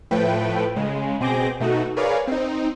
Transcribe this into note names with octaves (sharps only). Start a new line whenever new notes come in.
A2 F3 A3 B4 G5
C#3 G#3
B2 C4 G#4 D6 G6 A#6
B2 A3 D#4 F#4
G#4 A#4 B4 C#5 D5 F5
C4 D#4